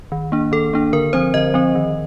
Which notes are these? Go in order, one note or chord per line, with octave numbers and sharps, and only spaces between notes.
D#3
A#3 D4
D#3 A4
A#3 D4
D3 A#4
F3 C4 C5
D3 D#5
F3 C4
D#3